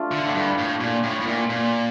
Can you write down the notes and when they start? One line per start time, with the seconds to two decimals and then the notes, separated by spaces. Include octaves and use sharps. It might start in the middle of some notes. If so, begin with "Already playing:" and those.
Already playing: A3 D4 F4 A4
0.11 D3
0.26 A2
0.34 G2
0.58 A2
0.81 A#2
1.03 A2
1.20 A2
1.27 A#2
1.50 A#2